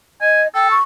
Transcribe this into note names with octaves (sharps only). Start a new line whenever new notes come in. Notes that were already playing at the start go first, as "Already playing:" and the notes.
D#5 G#5
A4 G5
C#6